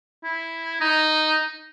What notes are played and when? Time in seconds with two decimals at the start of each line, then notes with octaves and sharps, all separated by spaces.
0.24 E4
0.81 D#4